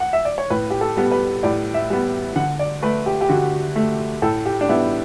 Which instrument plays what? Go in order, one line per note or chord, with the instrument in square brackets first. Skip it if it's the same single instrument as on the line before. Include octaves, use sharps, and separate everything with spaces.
[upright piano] F#5
E5
D5
C#5
A2 B4
G4
A4
G3 B3
B4
A2 D5
E5
G3 B3
D3 F#5
D5
A3 B4
G4
G4
D3 F#4
A3
A2 A4
G4
D4
G3 B3 E4